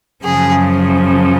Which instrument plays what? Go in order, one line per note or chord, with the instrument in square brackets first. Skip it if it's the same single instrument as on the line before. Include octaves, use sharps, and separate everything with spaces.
[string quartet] F#2 C#3 F3 G#4